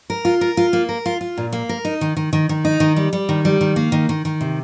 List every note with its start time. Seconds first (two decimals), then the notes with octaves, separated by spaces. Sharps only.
0.10 A#4
0.25 F4
0.41 A#4
0.57 F4
0.73 A#3
0.89 A#4
1.06 F4
1.21 F4
1.38 A#2
1.53 A#3
1.69 A#4
1.85 D#4
2.01 D#3
2.17 D#3
2.33 D#3
2.49 D#3
2.65 D#4
2.80 D#3
2.96 G3
3.13 G3
3.29 D#3
3.45 G3
3.61 D#3
3.76 A#3
3.92 D#3
4.09 D#3
4.25 D#3
4.41 C3